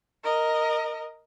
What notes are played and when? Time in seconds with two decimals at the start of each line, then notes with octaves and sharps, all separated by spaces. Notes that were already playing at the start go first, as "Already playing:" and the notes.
0.24 A#4 D#5